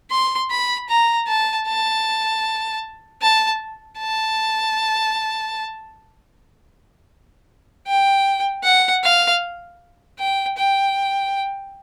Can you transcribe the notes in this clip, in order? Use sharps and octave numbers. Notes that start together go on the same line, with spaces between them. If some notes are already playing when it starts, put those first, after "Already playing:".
C6
B5
A#5
A5
A5
A5
A5
G5
F#5
F5
G5
G5